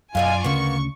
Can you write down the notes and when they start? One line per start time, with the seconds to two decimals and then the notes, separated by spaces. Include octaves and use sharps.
0.15 F#2 B2 G3 F4 D5 F5 G#5
0.44 D2 C#3 A#3 B3 C#4 C#6